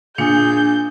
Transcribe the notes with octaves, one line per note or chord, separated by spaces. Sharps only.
A#2 D4 G#4 G6 C#7